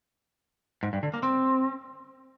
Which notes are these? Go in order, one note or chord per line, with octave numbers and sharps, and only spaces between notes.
G#2
G2
D3
A#3
C4